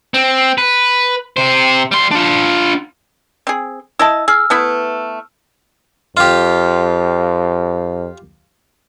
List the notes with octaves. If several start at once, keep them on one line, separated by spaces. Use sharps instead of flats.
C4
B4
C3 C5
G3 C6
D4 F4
C4 G#4
E4 D#5 A5 E6
G#4 E6 F6
A3 B3 E4
F2 F4 G4